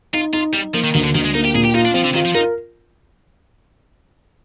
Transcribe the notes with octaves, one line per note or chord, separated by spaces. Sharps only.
D#4 F4
D#4 F4
G3 D#4
F3 A#3
D#3
D2 D#3
D3
D2 D#3
G#3
A#3 D#4
G4
A#2 G#4
G4
D#4 F4
D4
F3 C4
D3
D#3 F4
F3
D#4 A#4